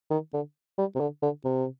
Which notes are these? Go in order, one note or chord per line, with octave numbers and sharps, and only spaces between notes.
D#3
D3
G3
C3
D3
D3
C3